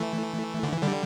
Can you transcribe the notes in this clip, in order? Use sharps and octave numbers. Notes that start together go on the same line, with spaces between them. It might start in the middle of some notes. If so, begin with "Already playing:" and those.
Already playing: E3 A3
D3
E3
D3 G3